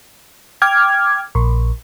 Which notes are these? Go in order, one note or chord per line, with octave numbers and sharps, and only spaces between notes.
G5 D6 F6 G#6
A#1